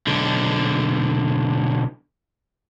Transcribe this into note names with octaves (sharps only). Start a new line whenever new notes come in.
B1 D3